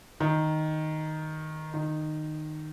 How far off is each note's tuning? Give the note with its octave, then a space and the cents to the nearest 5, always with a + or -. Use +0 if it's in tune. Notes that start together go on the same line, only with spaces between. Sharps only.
D#3 +0
D#3 -15